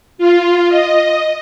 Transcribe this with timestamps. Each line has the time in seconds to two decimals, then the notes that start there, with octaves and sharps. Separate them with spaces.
0.18 F4
0.69 D#5